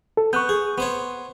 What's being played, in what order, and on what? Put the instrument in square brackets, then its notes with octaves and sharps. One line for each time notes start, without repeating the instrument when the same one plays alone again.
[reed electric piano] A4
[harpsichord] B3 [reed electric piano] C#6 F#6 G6
[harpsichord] G#4
B3 C5 C#5